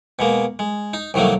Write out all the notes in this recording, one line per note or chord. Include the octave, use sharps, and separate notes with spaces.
B2 G#3 A#3
G#3
D#4
C2 D#3 F#3 A3 A#3